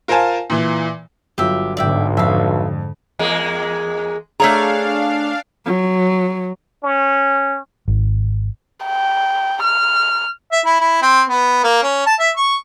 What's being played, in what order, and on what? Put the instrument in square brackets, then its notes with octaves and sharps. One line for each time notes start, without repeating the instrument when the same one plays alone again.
[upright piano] F4 A#4 C5 F5 G#5 A5
A#2 E3
[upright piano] G1 F#3 F4 [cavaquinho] G4 E5
[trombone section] B1 [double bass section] G#2 D3 [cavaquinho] D5 E5 G5
[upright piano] F2 [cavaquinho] E5 F5
[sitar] E2 G#3 A#3
[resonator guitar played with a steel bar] A3 C#5 A#5 [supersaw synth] D4 F5 [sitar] G#4
[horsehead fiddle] F#3
[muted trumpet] C#4
[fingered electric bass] G#1
[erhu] G5
F6
[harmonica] E5
E4
E4
C4
B3
A#3
C#4
A5
E5
C#6